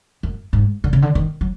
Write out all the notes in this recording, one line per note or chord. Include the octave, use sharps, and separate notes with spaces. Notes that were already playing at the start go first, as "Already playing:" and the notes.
F#2
G#2
D3
C#3
D3
D#3
F#3